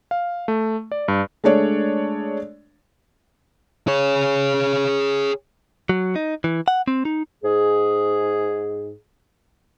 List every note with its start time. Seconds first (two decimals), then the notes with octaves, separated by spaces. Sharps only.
0.11 F5
0.48 A3
0.92 D5
1.08 G2
1.44 G#3 A3 D4 C#5 D5
3.88 G#4 C#5
5.89 F#3
6.16 D#4
6.44 E3
6.68 F#5
6.88 C4
7.05 D#4
7.43 G#2 G#4